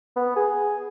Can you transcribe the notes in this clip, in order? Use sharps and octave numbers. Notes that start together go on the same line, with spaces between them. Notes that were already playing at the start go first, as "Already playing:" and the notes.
B3
G#4